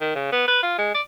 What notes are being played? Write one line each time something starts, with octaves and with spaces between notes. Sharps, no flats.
D#3
C#3
B3
B4
F4
G#3
D5